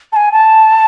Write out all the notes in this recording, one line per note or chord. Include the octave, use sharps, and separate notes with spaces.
A5
G#5
A5